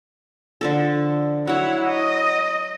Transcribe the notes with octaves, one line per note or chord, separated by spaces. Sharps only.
D3 F3 A4
F#3 E4 C#5 F#5
D#5